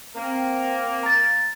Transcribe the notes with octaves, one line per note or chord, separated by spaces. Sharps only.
A#3 C4
A#5 A6